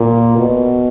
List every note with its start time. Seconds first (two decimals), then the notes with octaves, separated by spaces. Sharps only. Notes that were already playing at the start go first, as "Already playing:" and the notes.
Already playing: A#2
0.37 B2